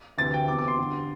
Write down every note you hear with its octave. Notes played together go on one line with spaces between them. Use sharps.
D2 C3 E3 A6
G5
E2 C3 E3 D6
D6
C6
G2 D3